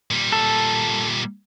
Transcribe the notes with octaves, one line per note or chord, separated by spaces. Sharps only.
A#2 G3
A4